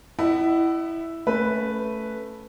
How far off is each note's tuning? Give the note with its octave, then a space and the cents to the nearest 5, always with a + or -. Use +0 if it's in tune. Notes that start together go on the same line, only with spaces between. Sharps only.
E4 +0 D#5 -30 F#5 +30
A3 +0 C#4 +0 B4 +0